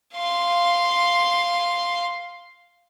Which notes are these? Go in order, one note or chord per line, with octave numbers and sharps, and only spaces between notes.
F5 C6